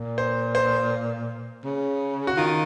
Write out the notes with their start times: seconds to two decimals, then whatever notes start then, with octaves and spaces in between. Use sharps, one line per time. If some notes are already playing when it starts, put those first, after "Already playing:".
Already playing: A#2
0.18 C5
0.55 C5
1.64 C#3
2.27 F#4
2.37 D#3 F4